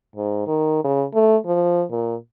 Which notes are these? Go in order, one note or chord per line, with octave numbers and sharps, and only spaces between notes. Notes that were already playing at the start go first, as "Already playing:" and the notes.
G#2
D#3
C#3
A3
F3
A#2